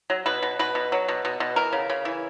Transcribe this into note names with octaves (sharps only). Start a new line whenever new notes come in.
F#3
B2 B4
B2
B2 B4
B2
F#3
B2
B2
B2
E3 A#4
C#3
C#3
E3